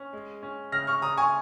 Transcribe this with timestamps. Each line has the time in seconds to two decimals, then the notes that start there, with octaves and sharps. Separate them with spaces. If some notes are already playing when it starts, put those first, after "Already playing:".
Already playing: C#4
0.13 G#3
0.43 C#4
0.72 C#3 F6 A#6
0.87 C#6 F6
1.02 C#3 A#5 D#6
1.17 G#5 C#6